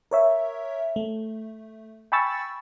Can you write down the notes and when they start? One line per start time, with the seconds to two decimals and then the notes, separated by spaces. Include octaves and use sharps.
0.11 A#4 C#5 E5
0.96 A3
2.12 G5 G#5 B5 C#6 E6 A6